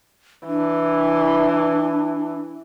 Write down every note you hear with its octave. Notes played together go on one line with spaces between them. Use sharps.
E3 D4